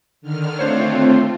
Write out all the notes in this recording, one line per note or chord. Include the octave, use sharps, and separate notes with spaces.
D3 D#3 F6
A3 C4 D4 F4 C5 C#5